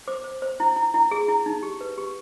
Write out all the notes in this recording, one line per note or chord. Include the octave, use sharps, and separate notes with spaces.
C5 D6
C5
C5
E4
E4
E4
G#4
E4
D#4
G4
B4
G4